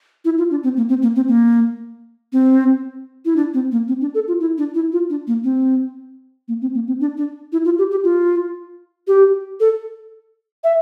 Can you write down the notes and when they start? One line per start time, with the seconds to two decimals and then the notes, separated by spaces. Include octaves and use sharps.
0.25 E4
0.38 F4
0.51 D4
0.63 C4
0.77 A#3
0.89 C4
1.02 A#3
1.16 C4
1.28 A#3
2.33 C4
3.25 E4
3.36 D4
3.54 C4
3.72 A#3
3.88 C4
4.01 D4
4.14 A4
4.28 F4
4.40 E4
4.58 D4
4.75 E4
4.92 F4
5.10 D4
5.27 A#3
5.44 C4
6.48 A#3
6.61 C4
6.74 A#3
6.87 C4
7.00 D4
7.17 D4
7.52 E4
7.65 F4
7.78 G4
7.91 G4
8.04 F4
9.07 G4
9.60 A4
10.64 E5